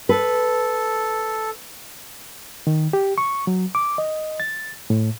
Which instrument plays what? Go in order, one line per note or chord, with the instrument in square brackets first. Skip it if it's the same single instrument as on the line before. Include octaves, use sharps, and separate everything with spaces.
[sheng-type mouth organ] A4 [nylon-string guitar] B4
[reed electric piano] D#3
G4
C#6
F#3
D6
D#5
A6
A2